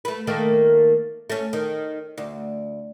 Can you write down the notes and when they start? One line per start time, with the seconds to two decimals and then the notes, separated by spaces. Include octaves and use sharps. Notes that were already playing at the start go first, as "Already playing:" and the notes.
0.05 A3 B4
0.27 D#3 A3 A#3
1.30 A3 C#4
1.53 D#3
2.18 D2